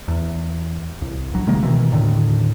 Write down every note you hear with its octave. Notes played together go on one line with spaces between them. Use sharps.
E2
C2
D1 A#1 F#3
C3 D#3 G#3 A#3
B2 D#3 E3
D#1 A2 D3 D#3